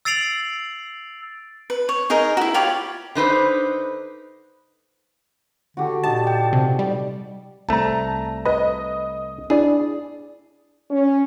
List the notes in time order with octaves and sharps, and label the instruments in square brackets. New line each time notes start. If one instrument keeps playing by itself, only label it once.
[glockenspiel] E6 A6 C7 D7 F7 F#7
[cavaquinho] B4
C#5
D#4 G#4 A#4 D#5
E4 F#4
F4 G4 C#5 B5
[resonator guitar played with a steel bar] D3 D#4 B4 C5
[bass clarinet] D3 [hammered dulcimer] F#4 G4 A4
[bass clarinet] A#2 [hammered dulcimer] D#4 G4 [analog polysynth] A5
[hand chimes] G5
[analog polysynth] C3
G3
[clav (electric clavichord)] C2 A3 [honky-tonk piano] A5 A#5
[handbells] B4 B5 [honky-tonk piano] D#5
[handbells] D4 E4 D5 [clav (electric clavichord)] G#4
[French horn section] C#4